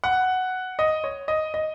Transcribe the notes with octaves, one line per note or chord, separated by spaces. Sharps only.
F#5
D#5
C#5
D#5
D#5